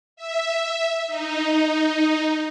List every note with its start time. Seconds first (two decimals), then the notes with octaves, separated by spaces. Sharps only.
0.16 E5
1.07 D#4